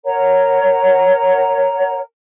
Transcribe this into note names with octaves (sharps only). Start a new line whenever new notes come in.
A#4 C#5 F#5 A#5